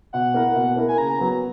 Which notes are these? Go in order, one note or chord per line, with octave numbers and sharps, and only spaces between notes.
B2 F#5
A#3 E4 A#4
B2
A#3 E4 A#4
G#5
C#3 A#5
F#3 B3